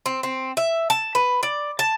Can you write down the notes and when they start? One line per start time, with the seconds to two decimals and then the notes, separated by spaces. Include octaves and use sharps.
0.06 C4
0.23 C4
0.57 E5
0.90 A5
1.15 B4
1.43 D5
1.79 A5